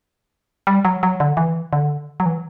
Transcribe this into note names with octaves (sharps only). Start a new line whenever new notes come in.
G3
F#3
F#3
D3
E3
D3
F#3
E3